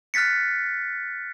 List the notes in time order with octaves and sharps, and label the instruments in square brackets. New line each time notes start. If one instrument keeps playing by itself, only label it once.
[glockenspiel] F6 F#6 A6 B6 C#7